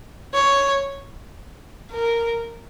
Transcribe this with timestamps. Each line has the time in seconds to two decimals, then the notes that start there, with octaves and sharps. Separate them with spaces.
0.34 C#5
1.92 A#4